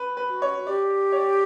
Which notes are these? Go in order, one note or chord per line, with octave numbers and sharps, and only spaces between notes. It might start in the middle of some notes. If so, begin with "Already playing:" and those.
Already playing: B4
B4
F#4
C#5
G4 D5
C#5
D5